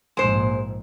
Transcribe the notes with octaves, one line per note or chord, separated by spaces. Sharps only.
A#1 G#2 G#3 C5